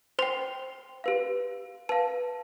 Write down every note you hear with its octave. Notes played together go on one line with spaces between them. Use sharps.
C5 G5 C6
G4 B4 F5
B4 F5 A5